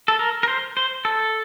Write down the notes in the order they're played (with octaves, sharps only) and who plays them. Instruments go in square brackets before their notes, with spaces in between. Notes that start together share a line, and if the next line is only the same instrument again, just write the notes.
[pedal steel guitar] A4
A#4
A#4
C5
C5
A4